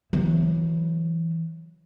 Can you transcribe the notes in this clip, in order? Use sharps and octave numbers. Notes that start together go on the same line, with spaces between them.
E3 F#3